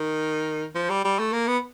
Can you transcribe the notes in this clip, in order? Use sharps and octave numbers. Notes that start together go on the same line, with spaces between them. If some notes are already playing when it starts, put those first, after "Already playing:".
Already playing: D#3
F3
G3
G3
A3
A#3
B3